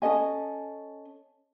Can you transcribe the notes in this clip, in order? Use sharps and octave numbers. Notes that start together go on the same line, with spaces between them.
C#4 A4 D#5 G#5